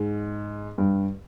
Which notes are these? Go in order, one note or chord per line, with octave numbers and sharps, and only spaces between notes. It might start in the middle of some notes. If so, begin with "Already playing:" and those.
Already playing: G#2
G2